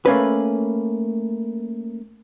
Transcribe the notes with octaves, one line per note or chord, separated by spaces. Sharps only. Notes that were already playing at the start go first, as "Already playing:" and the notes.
A3 A#3 C#4 B4